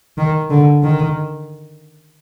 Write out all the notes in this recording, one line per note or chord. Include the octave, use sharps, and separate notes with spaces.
D#3
D3
D#3